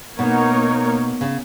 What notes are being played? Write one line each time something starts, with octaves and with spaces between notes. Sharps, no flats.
B2 A#3 D#4 A#4 C#5
C#3